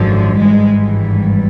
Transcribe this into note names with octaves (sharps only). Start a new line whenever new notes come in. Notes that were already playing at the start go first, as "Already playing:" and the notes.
Already playing: G#1 F#2 D3 F3
G#1 G2 E3 G#3